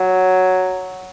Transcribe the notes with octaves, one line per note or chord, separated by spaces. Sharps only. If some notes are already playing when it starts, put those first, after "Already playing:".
Already playing: F#3